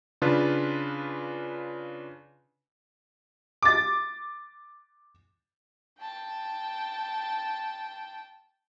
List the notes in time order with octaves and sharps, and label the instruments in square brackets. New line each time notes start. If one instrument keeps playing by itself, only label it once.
[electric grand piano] C#3 D4 F4 B4
[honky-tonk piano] D6 A6
[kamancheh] G5 A5